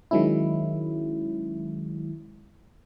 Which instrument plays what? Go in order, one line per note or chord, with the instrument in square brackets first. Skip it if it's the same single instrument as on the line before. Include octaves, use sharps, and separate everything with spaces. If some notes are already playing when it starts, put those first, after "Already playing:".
[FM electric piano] D#3 F#3 G#3 C#4 E4